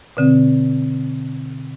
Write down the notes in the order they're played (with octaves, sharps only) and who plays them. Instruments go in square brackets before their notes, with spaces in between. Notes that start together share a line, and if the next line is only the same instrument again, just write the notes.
[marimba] B2 D3 C4